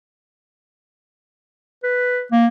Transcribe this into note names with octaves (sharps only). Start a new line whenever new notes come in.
B4
A#3